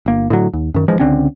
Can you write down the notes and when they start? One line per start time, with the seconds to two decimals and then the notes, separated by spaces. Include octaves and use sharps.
0.06 G1 A#3
0.30 A2 D3 F#3
0.53 D#2
0.74 F#2 D#3
0.88 D1 E3 F3 G#3
0.99 C#2 D3 C4 C#4